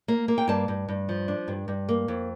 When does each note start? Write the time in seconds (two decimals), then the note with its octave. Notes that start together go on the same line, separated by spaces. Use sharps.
0.08 A#3
0.28 A#3
0.38 G5
0.48 G2 A5
0.68 G2
0.88 G2
1.09 F3
1.28 D4
1.48 G2
1.68 G2
1.89 A#3
2.08 F2